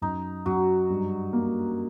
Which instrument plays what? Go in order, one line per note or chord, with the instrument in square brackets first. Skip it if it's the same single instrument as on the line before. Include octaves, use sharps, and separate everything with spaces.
[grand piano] F#2 [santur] D#4
[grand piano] F#2 [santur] F#3 F#4
[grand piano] G2
A#3